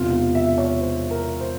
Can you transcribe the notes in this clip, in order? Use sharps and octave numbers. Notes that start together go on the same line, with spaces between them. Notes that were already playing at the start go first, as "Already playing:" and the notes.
Already playing: E1 E2 C3 F4
F4
E5
C#5
C5
A#4
C5